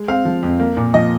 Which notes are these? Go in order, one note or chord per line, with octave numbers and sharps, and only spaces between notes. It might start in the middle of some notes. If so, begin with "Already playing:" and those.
Already playing: G#3
C4 F5
F3
F2
A#3
A#2
F3 D#5